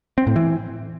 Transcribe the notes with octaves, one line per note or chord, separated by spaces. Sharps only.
C4
A2
E3